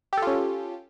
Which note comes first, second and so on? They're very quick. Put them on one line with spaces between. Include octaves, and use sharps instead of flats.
G4 A4 F4 C#4